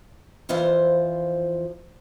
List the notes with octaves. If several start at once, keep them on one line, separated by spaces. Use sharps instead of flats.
F2 E3 F3 F4 C5